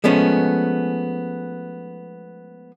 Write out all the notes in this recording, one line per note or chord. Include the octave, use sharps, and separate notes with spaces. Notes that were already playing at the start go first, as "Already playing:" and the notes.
F3 G#3 A3 B3 C#4